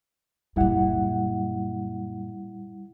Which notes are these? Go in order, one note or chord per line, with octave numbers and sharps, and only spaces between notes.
F#2 A#2 G3 E4 F#5